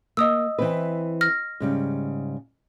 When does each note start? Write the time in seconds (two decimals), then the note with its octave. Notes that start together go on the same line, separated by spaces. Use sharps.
0.17 A#3 D#5 D#6 E6
0.58 E3 C4 B4
1.21 F6 A#6
1.60 G#2 C#3 G3